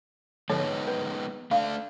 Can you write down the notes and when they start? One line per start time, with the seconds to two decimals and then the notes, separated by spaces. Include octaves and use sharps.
0.50 D3 F3 G#3 B3 D#4 C#5
0.87 B4
1.51 A3 D4 F5